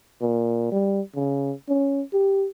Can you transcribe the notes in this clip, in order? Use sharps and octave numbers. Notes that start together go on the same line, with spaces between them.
A#2
G3
C#3
C#4
G4